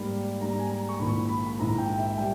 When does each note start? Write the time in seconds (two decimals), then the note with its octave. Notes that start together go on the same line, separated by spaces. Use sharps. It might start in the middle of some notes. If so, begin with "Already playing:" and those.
Already playing: G#2 G3 A#3 B5
0.41 G#2 G3 A#3 A#5
0.59 G#5
0.70 A#5
0.89 C#6
0.99 A#1 G#2 D#3 A#3 E4 B5
1.29 B5
1.48 B5
1.58 A#1 G#2 D#3 A#3 E4 A#5
1.78 G5
1.98 E5
2.18 G3 G5